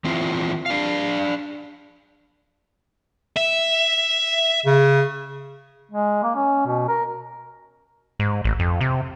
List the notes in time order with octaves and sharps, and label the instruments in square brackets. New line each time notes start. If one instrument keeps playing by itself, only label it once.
[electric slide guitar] E3 C4 E4 F4
D4 F5
[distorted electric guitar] E5
[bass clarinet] C#3
[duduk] G#3
A#3
C#4
B2
A#4
[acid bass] G#2
A1
F2
C3